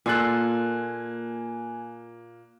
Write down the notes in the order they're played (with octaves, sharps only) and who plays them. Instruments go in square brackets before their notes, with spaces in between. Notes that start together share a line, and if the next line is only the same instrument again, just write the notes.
[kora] A#2 F4 A4 [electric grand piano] A#3 [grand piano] G#5 F#6